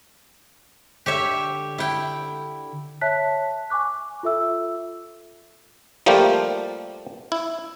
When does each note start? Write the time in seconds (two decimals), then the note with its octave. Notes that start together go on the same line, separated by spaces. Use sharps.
1.06 D3 G4 C#5 E5
1.78 E4 G5
3.01 C#5 E5 A5 F#6 B6
3.70 G#5 C#6 D6 F#6
4.23 F4 A4 E5 E6
6.06 F3 G3 A3 A#3 F4 G4
7.32 E4